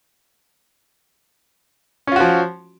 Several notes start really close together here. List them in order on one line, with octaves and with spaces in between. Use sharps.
C#4 F4 F#4 F3